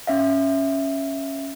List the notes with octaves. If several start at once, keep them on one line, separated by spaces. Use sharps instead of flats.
C#4 E5 F5